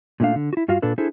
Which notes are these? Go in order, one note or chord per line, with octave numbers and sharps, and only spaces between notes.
A#2 D#3 A3 D4 F5
D3
E4 F#4
G2 F4 F#4 F5
A#2 D4 A4 B4
D4 E4 G#4 A4 C5